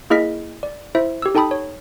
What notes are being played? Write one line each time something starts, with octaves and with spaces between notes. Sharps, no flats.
A#3 E4 G#4 D#5 F6 B6
D5
E4 C5 E5
G4 E6
D#4 A4 G5 A5 B5 D#6
C#5